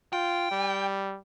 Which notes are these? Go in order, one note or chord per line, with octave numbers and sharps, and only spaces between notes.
F4 G5
G3